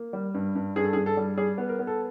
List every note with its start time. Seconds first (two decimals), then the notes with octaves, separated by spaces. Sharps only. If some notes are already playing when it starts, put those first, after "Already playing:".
Already playing: A#3
0.13 G3
0.34 G2
0.55 G2
0.76 G2 G#4
0.84 A4
0.93 G#4
0.96 G2
1.06 A4
1.17 G3
1.38 G3 G#4
1.58 B3
1.69 A#4
1.79 B3
1.87 A4